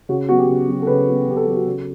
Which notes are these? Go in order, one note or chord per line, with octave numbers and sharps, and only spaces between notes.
C#3 F#4
F#3 B3 F#4
G4
C#3
F#3 B3
A4
C#3 B4
F#3 B3
C#3 G4
A4
F#3 B3 G4
F#4
C#3